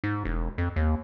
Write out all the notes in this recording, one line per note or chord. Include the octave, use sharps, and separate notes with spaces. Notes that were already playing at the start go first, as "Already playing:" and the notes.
G#2
E1
F2
D#2